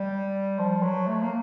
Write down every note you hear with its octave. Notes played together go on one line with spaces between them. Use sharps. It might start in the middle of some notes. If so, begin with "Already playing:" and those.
Already playing: G3
F3
F#3
A3
A#3